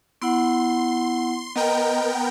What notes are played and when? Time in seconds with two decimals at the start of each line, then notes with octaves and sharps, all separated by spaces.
0.22 B3 E4 F#5 C6
1.56 B3 A#4 D#5 G5 A#5